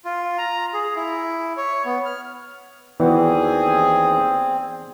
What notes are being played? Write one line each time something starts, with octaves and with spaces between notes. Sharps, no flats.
F4
A#5
G#4
E4
C#5
B3
F6
D#2 E3 B3 C4 F#4 G#4 D5